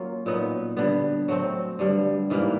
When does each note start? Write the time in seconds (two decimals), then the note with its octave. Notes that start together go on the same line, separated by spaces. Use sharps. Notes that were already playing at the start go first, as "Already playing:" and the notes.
Already playing: F#3 A#3 C#4 F4
0.26 A#2 F#3 B3 D#4
0.77 D3 G3 B3
1.28 F#3 A3 C4
1.79 G2 D3 G3
2.30 G#2 E3 G3 A#3